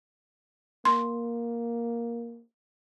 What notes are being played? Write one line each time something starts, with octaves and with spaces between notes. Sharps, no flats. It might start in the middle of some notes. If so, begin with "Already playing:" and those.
A#3 C6